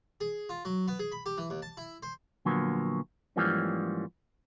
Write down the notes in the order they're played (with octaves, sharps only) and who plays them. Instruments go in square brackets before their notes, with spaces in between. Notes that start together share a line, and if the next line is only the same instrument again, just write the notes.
[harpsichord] G#4
F4
F#3
B3
G#4
B5
G4
E3
D#2
A5
E4
C5
[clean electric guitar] A#2 D3 F3 F#3 A#3 B3
G#2 E3 F3 G3 A#3 C#4